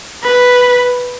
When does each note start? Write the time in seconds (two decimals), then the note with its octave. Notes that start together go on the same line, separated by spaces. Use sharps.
0.23 B4